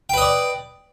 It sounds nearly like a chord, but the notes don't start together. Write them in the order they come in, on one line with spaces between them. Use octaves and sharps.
G5 B4 D#5 D5